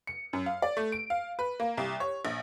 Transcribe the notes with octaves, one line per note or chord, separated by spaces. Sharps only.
C#7
F#2
F5
D5
A3
D7
F5
B4
A#3
C2
C#5
A#1